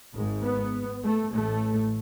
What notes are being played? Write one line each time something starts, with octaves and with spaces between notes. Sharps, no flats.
G#1 G#2
B3
A3
A1 A2 A3